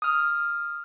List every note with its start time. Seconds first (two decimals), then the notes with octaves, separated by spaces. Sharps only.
0.02 D#6 F6